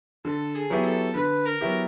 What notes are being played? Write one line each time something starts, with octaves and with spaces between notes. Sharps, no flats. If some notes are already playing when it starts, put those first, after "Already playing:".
D3 A4
G#4
F#3 B3 E4 G4
A4
D3 B4
A#4
F#3 B3 E4 G4